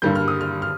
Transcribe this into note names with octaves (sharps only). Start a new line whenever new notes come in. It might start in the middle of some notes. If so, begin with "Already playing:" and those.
G2 D3 G3 A#3 G6
F6
D#6
F6
F6